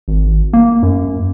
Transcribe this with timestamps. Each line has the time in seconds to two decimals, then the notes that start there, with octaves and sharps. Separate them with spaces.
0.08 G#1
0.53 A#3
0.83 F#2